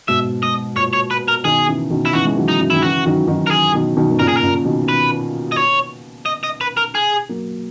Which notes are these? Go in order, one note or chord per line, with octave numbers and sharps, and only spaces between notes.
G#2 B2 E5
G#2 D#5
A#2 C#5
C#5
B4
A#4
B2 D#3 G#4
C#3 E3
B2 D#3
E4
C#3 E3 F#4
G#3
D#3 F#3
D#4
C#3 E3
D#3 E4
C#3 E3 F#4
D#3 F#3
D#3 F#3
A#4
G#4
B2 D#3
B2 D#3
D#3
A#2 C#3 A#4
G#4
A#4
A#2 C#3
B2 D#3
B4
D#5
C#5
D#5
D#5
B4
A#4
G#4
F#3 A#3